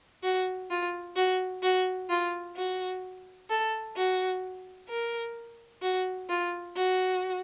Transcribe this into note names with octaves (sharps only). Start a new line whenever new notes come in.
F#4
F4
F#4
F#4
F4
F#4
A4
F#4
A#4
F#4
F4
F#4